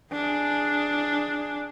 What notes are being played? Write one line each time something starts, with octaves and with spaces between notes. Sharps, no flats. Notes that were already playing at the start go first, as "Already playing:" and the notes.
D4 G#4